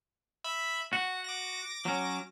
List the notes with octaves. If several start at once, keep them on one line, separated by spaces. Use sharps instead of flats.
E5 B5
F#4 F#5
D6 A#6
F#3 C#4